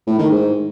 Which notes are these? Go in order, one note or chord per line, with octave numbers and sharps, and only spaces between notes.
A2
D#3
G#2